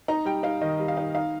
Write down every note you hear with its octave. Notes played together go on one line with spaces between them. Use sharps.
D#4 A#5
G3 G5
D#4 F5
D#3 D#5
G3
F5
D#4
D#4 F5